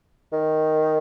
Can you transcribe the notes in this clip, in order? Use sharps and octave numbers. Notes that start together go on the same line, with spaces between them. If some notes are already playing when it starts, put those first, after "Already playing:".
D#3